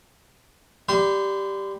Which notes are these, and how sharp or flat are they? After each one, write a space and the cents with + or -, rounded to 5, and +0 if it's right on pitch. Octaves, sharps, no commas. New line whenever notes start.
G3 +0 C6 -30